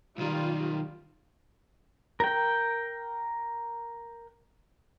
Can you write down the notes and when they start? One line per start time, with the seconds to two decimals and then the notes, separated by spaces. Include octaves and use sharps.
0.18 B1 D#3 G3 F4
2.20 A#4 G5